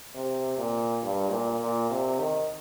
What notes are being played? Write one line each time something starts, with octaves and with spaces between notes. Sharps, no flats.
C3
A#2
G2
A#2
A#2
C3
D#3